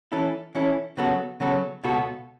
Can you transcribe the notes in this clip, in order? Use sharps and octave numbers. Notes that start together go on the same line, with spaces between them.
E3 C#4 E4 A4
E3 C#4 E4 A4
C#3 F#3 B3 F#4 A4
C#3 F#3 B3 F#4 A4
C#2 B2 B3 F#4 A4